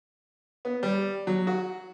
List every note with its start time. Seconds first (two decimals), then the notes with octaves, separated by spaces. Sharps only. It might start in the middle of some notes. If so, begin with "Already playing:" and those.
0.65 B3
0.83 G3
1.27 F#3
1.47 F#4